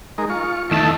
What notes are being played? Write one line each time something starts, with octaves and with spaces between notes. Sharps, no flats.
G#3 D#4 A#4
F4 C#6
E2 D#3 A3 E4 A5